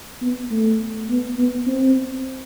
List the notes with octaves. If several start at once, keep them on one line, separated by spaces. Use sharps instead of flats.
B3
A3
B3
B3
C4